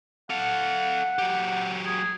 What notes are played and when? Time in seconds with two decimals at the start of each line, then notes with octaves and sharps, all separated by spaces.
0.30 A4 F5 F#5
1.18 F#3 G4
1.85 G#4